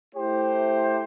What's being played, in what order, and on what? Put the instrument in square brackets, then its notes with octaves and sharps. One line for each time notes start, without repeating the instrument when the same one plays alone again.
[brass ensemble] A3 E4 G4 C5